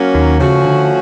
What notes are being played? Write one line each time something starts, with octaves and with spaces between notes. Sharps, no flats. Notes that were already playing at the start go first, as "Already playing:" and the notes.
Already playing: F#3 A#3 C#4
D#2 D#3
C#3 F3 A3 C#4 F#4
D3